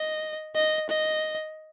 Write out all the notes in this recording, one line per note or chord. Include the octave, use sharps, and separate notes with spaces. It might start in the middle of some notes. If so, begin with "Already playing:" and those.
Already playing: D#5
D#5
D#5